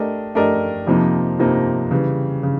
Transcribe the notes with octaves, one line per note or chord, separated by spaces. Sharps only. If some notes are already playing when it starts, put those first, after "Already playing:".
Already playing: A3 D4 G4 A#4 D#5
A3 D4 G4 A#4 D#5
F2 C3 F3 A#3 D#4
F2 C3 F3 A#3 D#4
C#3 E3 G3
C#3